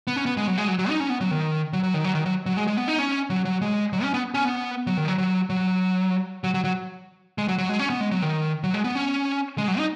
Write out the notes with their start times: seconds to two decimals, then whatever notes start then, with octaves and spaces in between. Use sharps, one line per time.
0.08 B3
0.16 C#4
0.26 B3
0.37 G#3
0.47 F#3
0.58 G#3
0.68 F#3
0.79 F#3
0.89 D#4
1.00 C#4
1.10 B3
1.21 F#3
1.31 D#3
1.73 F#3
1.83 F#3
1.94 D#3
2.04 F#3
2.15 D#3
2.26 F#3
2.46 F#3
2.57 G#3
2.67 G#3
2.77 B3
2.88 D#4
2.99 C#4
3.30 F#3
3.45 F#3
3.62 G#3
3.93 F#3
4.03 C#4
4.14 B3
4.34 C#4
4.45 B3
4.87 F#3
4.97 D#3
5.08 F#3
5.18 F#3
5.50 F#3
6.44 F#3
6.54 F#3
6.64 F#3
7.38 G#3
7.48 F#3
7.58 F#3
7.69 G#3
7.80 C#4
7.90 B3
8.01 G#3
8.12 F#3
8.22 D#3
8.64 F#3
8.74 G#3
8.84 B3
8.95 C#4
9.58 G#3
9.68 F#3
9.78 D#4